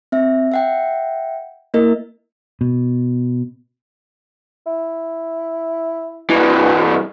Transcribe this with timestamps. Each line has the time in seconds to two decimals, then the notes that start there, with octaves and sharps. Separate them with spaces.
0.12 C4 E5
0.52 E5 F#5 G5
1.74 A#3 E4 A#4 D#5
2.61 B2
4.67 E4
6.30 G2 B2 E3